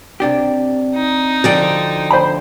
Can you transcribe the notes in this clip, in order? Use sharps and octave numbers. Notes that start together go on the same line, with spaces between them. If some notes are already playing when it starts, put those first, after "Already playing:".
C3 D4 G4
D#4
D3 F3 F#4 A4 D5 G5
C5 B5